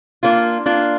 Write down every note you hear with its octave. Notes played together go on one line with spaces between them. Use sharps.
A#3 D4 F4
A#3 D4 F4